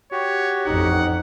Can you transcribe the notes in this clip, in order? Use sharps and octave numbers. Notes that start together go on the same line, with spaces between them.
F#4 G4 C#5
A1 F2 D#4 F#5